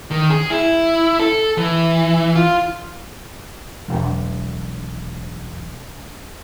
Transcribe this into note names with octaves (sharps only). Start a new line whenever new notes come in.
D#3
G#4
E4
A4
E3
F4
E1 B1